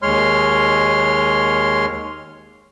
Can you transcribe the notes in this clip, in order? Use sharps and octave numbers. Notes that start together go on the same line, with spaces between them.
D#2 G#3 C#5 C6 F6